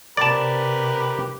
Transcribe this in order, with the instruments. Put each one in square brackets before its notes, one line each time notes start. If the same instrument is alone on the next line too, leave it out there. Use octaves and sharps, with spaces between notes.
[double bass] C3 [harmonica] G4 A#4 B4 [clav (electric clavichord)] D5 A5